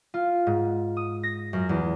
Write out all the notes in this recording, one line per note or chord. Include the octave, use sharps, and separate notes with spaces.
F4
G#2
D#6
A#6
F#2
E2